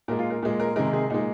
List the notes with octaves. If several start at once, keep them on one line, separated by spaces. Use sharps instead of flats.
A#2 G#3 A#4
F4
A#4
A#2 G#3
A#4
C3 D#3 G#3 A#4
G#4
A#2 G#3 D#4